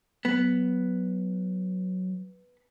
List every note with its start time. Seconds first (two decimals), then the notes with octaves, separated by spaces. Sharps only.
0.25 F#3 B3